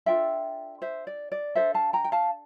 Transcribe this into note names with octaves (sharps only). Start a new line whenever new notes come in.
D4 F4 A4 E5 G5
C5 E5
D5
D5
D4 A4 C5 E5
F5 A5
G5 A#5
G5
F5 A5